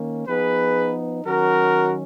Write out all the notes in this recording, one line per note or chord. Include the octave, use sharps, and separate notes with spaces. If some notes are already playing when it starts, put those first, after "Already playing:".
Already playing: D#3 A#3 C#4
F3 B3 D#4 G#4 B4
D#3 F#3 C#4 F#4 A#4